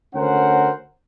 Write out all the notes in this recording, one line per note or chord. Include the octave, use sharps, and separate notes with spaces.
D2 C#4 A#4 C5 F#5